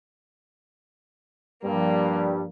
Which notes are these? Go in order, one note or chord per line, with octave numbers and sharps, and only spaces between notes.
G2 F3 G3 A#3